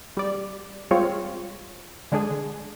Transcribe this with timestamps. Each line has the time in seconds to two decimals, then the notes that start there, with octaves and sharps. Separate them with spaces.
0.17 G3 D5
0.91 G3 G#3 C4 F4 C#5
2.12 D3 G#3 D4 G#4